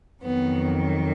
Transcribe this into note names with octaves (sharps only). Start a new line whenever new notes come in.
F2 D#3 F#3 B3